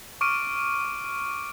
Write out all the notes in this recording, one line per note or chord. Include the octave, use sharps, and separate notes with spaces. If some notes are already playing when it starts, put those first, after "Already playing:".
C#6 D6 F6 D7 D#7